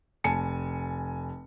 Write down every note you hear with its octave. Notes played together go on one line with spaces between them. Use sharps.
F1 G#5 A5 C#7